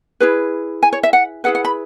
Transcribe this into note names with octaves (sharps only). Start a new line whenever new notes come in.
E4 G#4 B4
G#5
C#5
E5
F#5
E4 G#4 B4 F#5
F#5
B5